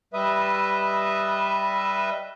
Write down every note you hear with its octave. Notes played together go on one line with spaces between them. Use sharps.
G3 B4 D#5 E5